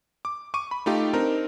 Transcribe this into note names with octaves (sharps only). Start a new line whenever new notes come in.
D6
C#6 D6 D#7
B5
A3 D#4 F4 G4
C4 D4 D#4 A#4